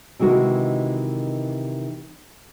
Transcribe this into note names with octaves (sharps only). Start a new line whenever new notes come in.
C3 D#3 E3 G#3 A#3 F#4